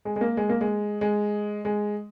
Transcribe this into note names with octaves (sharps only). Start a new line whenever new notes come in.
G#3
G#3
A#3
G#3
A#3
G#3
G#3
G#3